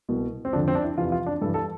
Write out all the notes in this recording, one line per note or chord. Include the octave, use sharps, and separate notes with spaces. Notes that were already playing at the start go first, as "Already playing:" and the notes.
C2 B2
C4
F2 D3 F3 D4
C4
D4
E4
F2 C3 E3 F4
F4
D4
G2 E3 A4
A4